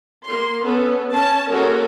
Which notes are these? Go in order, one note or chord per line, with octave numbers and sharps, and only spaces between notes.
A#3 C6
B3 C#4 A4
C#4 A5
G#3 A#3 C#4 F#4 A4 A#4